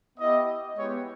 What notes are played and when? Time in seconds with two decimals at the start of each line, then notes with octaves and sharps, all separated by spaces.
0.19 B3 E4 G4 D#5
0.77 G#3 B3 E4 G4 C#5